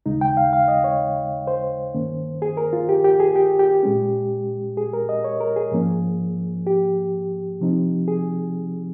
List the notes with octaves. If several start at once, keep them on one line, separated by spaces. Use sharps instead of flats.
D#2 C#3 G#3 D#4
G5
F5
F5
D#5
C#5
C5
G2 D#3 A#3 C#4
G#4
A#4
F4
G4
G4
G#4
G4
G4
A#2 G#3 C#4
G#4
A#4
D#5
C#5
A#4
G#4
G#2 F3 A#3 C#4
G4
C3 F3 C4 D#4
G#4